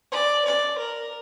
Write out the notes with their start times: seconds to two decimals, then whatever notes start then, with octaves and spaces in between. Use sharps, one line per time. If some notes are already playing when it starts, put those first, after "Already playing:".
0.12 D5
0.45 D5
0.78 A#4